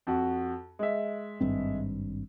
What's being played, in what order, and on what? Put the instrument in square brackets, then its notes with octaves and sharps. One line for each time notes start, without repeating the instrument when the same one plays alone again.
[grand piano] F2 F#4
G#3 E5
[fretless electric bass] G#1 G2 C4